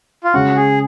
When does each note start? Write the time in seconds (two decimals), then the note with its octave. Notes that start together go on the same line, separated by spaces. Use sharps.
0.24 F4
0.34 C#3 G#3 C#4 F#4
0.56 G#4